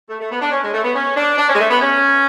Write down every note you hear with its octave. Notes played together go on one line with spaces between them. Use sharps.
A3
A3
B3
D4
C#4
G#3
A3
B3
C#4
D4
D4
C#4
G#3
A3
B3
C#4